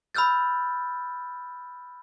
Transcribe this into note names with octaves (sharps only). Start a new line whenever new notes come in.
B5 E6 F6 G6 A6